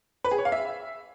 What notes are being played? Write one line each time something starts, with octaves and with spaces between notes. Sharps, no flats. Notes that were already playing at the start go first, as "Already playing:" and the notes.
B4
G#4
C#5
F5
E5